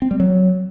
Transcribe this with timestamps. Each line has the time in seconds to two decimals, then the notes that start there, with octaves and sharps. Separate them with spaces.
0.02 C4
0.11 G3
0.20 F#3